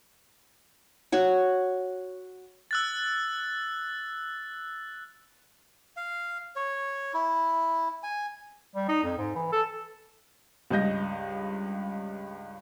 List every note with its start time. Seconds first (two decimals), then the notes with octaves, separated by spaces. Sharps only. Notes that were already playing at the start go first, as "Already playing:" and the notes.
1.12 F#4 C#5
2.71 E6 F#6 A6
5.96 F5
6.56 C#5
7.14 E4
8.03 G#5
8.75 G3
8.89 D#4
9.04 F2
9.18 G#2
9.36 E3
9.53 A4
10.71 C#2 G2 D#5 G6 A#6